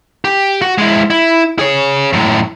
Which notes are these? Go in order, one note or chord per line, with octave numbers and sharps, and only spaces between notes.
G4
F#4
G#3 E4
E4
G#4 C#5
F#2 A2